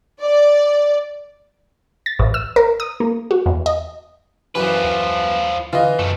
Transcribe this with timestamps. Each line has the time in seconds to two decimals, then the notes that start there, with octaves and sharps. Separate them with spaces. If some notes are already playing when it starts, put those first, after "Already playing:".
0.21 D5
2.06 A6
2.19 A1
2.34 E6
2.56 A#4
2.80 D#6
3.00 A#3
3.31 F#4
3.46 E2
3.66 D#5
4.55 F#2 E3 F3 B4
4.84 D#2
5.73 D3 E3 F4 D#5
5.99 B1 F#2 A3